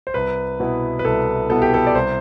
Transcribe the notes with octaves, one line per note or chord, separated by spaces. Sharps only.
C5
C2 B4
B2 B3 E4
B4
C2 A4
B2 B3 E4 A4
G4
A4
D5
C2 C5